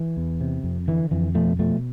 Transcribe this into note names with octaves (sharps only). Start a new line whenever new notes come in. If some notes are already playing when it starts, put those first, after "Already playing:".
Already playing: E3
E2
C3
F2
D3 E3
F2 E3
B2 F3 A3
B2 F3 A3